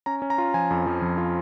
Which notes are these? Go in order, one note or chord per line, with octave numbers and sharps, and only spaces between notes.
C#4 A#5
C#4
A#5
F4
F3 G#5
F2
F3
F2
F4